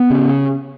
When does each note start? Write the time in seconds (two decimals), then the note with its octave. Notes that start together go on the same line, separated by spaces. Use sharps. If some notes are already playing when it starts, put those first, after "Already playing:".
Already playing: B3
0.10 C#3